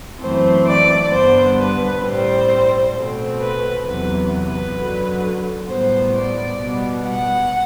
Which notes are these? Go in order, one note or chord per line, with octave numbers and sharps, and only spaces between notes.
F#2 E3 A3 C4 C5
D5
G2 D3 G3 B3 C5
B4
A2 G3 C4 C5
B2 A3 C4
B4
E2 C3 F#3 B3 B4
B4
F#2 D3 F#3
A2 G3 B3 C5
D5
B2 G3 B3
F#5